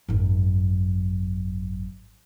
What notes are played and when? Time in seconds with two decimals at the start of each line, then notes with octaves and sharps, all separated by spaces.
0.09 G#1 F#2